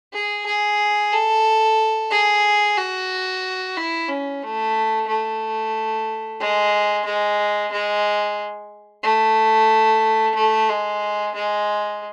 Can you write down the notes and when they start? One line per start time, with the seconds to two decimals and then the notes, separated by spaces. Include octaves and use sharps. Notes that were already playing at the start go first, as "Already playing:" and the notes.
0.14 G#4
0.46 G#4
1.13 A4
2.11 G#4
2.77 F#4
3.77 E4
4.09 C#4
4.43 A3
5.07 A3
6.40 G#3
7.05 G#3
7.72 G#3
9.03 A3
10.35 A3
10.69 G#3
11.35 G#3